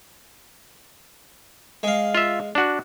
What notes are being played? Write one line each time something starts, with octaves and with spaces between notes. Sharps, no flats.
G#3 F5
F4 E5
D4 F#4